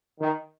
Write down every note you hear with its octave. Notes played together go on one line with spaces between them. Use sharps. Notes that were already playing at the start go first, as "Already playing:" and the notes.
D#3